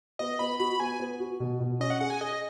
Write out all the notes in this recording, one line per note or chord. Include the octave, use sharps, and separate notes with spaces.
B3 D#5
B3 B5
F#4 B5
B3 G#5
B3
F#4
B2
B2
C#4 D#5
F#5
G#4 F#5
G#5
G#4 D#5